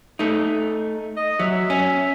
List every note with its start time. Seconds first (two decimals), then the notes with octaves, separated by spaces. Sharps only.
0.19 A3 D#4
1.17 D#5
1.39 F#3 E5
1.70 C#4